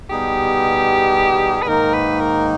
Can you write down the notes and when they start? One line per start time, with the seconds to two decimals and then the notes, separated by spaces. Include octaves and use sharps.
0.10 B2 G3 B3 D#4 G4 G#4
1.62 B4
1.67 G#2 D#3 A#3 D#4 A#4
1.94 B4
2.20 A#4